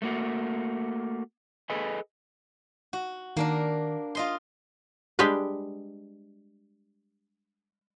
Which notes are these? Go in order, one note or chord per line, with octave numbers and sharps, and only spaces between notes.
A3 A#3 F#4
G#4 A4 B4 D#5 G#5
F#4
D#3 A#3 D4 A#4
F4 D#5 C6
G3 G#3 D4 G4 B4